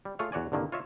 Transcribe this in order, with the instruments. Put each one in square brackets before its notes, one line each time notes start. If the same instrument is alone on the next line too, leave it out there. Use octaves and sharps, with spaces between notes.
[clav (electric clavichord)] G3
A3 F4 G#4 C#5 F5
E2 F#4 C#5 D5 G#5
C2 G2 D3 D#3 A#3
F4 C#5 D#5 E5